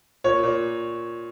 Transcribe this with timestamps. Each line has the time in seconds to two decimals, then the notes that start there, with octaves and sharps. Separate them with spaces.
0.24 A#2 C#5
0.43 A#2